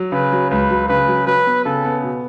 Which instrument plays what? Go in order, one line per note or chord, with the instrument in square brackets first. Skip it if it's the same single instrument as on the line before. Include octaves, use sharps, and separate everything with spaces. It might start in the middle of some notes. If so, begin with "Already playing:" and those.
Already playing: [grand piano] F#3
[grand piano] C#3 [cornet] B4
[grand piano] F#3
[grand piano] C#2 [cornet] B4
[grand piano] F#3
[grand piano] C#3 [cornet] B4
[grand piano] F#3
[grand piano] F#3 [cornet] B4
[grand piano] B3
[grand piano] C#3 [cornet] A4
[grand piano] B3
B2